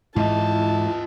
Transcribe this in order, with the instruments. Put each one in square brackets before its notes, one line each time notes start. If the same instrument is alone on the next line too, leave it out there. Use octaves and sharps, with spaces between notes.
[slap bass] G#2 E3 [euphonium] E4 [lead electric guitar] F4 D#5 [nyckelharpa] A5